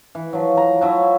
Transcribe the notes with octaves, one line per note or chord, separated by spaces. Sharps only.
E3
F3 F#3
A#5
F3 F#3 E4